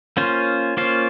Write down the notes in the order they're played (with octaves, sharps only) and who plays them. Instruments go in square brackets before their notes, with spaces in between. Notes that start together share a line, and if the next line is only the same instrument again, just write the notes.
[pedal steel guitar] A#3 C#4 F4 C5
A#3 C#4 F4 C5